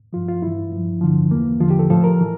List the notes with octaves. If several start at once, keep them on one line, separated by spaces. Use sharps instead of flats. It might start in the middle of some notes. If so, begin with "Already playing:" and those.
G2 F3 F4
F4
G2 E3 E4
G2 F3
G2 D3 F3
E2 E3 A#3
E2 D3 F3 F4
G4
A4
A2 F3 A4
A#4
E3